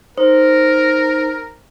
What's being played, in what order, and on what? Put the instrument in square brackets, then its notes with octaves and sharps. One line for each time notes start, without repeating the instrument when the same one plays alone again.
[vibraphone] D#4 [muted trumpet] A#4 [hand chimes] C5